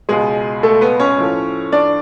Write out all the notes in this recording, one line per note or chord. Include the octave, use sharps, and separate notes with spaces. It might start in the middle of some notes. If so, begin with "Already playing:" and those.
C#2 B2 G#3 G#4
A3 A4
B3 B4
C#4 C#5
A2 F3 A3
D4 D5